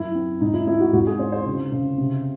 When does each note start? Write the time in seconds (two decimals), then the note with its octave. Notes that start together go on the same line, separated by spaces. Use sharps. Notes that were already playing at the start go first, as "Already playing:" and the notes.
Already playing: F#2 E4
0.15 C4
0.41 G#2 D#4
0.54 E4
0.67 C4 E4
0.80 F#4
0.93 G#2 F#4
1.07 G#4
1.19 C4 C5
1.32 C5
1.46 C#3
1.72 C#3
1.98 C3